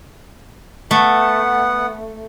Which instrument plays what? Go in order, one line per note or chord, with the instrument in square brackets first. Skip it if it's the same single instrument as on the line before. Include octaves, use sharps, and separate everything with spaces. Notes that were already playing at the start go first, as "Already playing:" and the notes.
[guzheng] A3 [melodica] B3 F#5